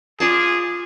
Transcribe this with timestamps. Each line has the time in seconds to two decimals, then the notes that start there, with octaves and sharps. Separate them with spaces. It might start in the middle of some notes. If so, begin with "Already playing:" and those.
0.20 F4 G#4 D5 A5